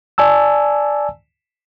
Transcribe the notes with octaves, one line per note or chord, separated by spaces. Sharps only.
D5 G#5 A5 E6